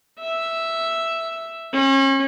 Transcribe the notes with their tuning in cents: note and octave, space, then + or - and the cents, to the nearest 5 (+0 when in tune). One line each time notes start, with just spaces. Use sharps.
E5 +0
C#4 -35